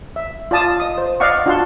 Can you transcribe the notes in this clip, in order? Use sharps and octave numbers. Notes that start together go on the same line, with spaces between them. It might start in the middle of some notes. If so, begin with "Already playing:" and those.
E5
F4 D5 A5 D#6
D#5 D#6
C5
D5 D#5 F5 F#5 C#6
D4 F4 F#4 F#5 A5 C6